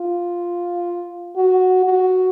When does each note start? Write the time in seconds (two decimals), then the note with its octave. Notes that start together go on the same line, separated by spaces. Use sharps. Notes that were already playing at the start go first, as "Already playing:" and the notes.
Already playing: F4
1.36 F#4
1.85 F#4